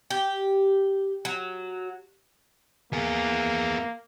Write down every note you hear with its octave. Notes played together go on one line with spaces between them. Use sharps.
G4
F#3
A#3 B3 G#4